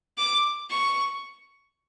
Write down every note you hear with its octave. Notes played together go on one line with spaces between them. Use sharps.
D6
C#6